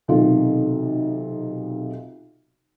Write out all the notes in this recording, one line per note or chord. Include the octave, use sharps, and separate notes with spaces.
B1 C3 D#3 F4